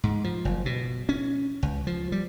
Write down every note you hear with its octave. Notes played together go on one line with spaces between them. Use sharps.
G#2
F3
F#1
B2
C#4
C#2
F3
G3